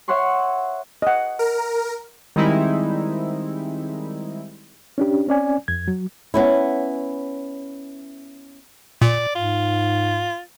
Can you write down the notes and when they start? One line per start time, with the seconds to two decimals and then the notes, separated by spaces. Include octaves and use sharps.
0.08 C#5 E5 F#5 C6 C#6
1.02 D#5 F#5
1.39 A#4
2.36 D#3 G3 G#3 C4 D#4 E4
4.98 C#4 D4 G4
5.27 C4 C#4 D5 G#5
5.68 F2 G#6
5.88 F#3
6.34 B3 C#4 E4
9.02 A#2 D5
9.35 G#2 F4